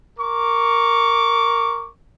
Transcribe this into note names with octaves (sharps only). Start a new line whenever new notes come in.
A#4 C#6 D6